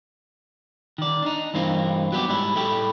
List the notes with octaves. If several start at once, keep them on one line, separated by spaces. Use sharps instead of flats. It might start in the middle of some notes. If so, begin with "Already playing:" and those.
D#3 D5
D4 D#4
G2 E3 A#3 C4 D#4
F#3 G3 B3 E4 G4
G#2 G3 E4
A2 G3 A3 E4 G4